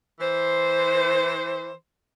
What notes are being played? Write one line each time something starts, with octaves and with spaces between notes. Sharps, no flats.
E3 C5